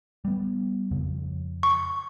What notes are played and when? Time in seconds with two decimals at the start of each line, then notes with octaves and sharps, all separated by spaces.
0.25 G3 B3
0.91 F2 C#3
1.63 C#6